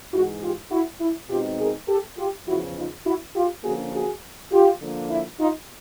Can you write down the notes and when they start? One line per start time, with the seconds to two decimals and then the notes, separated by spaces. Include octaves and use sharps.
0.12 G#2 E3 G#3 E4 F#4
0.42 F4 G4
0.70 E4 F#4
1.00 E4
1.29 B2 G#3 C4 D#4 F4 G4
1.59 G#4 A#4
1.88 G4 A4
2.17 F4 G4
2.47 E2 C#3 F3 E4 F#4
2.76 D#4 F4
3.05 E4 F#4
3.34 F4 G4
3.63 D3 F3 A#3 C#4 F#4 G#4
3.92 F#4 G#4
4.51 F4 G4
4.81 D3 F3 A#3
5.10 E4
5.39 D#4 F4